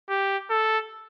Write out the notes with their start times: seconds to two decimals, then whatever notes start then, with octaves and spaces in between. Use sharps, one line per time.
0.09 G4
0.50 A4